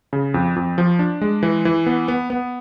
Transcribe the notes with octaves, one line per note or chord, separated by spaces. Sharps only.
C#3
F2
F2
F3
D4
G#3
E3
E3
B3
B3
B3